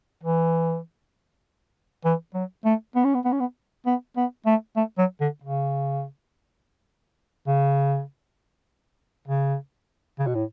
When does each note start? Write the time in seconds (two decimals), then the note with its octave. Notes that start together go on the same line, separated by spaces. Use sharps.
0.24 E3
2.05 E3
2.34 F#3
2.65 A3
2.95 B3
3.05 C#4
3.15 B3
3.25 B3
3.33 C#4
3.40 B3
3.86 B3
4.16 B3
4.46 A3
4.76 A3
4.98 F#3
5.21 D3
5.44 C#3
7.47 C#3
9.28 C#3
10.19 C#3
10.27 B2
10.35 A2